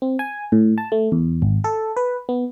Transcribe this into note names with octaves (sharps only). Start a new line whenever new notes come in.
C4
G#5
A2
A5
A3
E2
G#1
A4
B4
B3